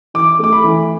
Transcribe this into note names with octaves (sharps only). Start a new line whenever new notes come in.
E3 D6
A3 D6
B5
E3